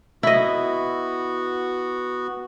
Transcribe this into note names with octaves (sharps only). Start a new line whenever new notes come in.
B3 E4 F#4 D#5